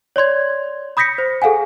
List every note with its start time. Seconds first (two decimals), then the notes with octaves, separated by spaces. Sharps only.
0.16 C#5 D5 C6 G#6
0.97 B5 D#6 G6 A#6 B6 C#7
1.18 C5
1.42 G#4 A4 F5 F#5 G#5